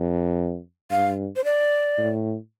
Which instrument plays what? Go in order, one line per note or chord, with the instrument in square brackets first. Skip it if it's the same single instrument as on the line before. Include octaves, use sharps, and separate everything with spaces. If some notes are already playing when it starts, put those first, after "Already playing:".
Already playing: [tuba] F2
[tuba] G2 [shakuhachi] F5
[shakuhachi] C5
D5
[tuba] A2